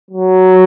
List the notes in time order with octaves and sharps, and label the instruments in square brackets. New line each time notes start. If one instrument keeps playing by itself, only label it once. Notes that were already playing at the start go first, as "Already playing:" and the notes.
[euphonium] F#3